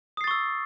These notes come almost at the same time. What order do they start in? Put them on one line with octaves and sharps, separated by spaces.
D#6 C7 A6 C#6 E6